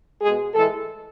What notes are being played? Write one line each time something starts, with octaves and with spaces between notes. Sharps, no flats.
B2 G#3 G#4
A2 E3 G#3 A4